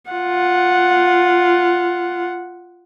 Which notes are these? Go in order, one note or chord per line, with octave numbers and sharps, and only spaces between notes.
F4 F#5